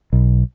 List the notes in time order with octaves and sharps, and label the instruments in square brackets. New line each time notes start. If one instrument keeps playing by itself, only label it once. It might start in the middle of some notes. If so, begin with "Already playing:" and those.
[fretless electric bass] B1